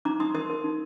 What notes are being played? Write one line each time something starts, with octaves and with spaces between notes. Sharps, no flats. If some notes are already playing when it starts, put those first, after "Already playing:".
D#4 A#5 D6
D#4 C6 D#6
A#4 C6 D#6
A#4
D#4